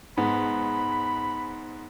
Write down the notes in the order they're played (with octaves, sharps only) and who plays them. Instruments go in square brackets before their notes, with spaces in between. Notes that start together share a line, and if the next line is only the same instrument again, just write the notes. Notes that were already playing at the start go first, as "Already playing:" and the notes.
[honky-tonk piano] G#2 [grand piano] B3 [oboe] B5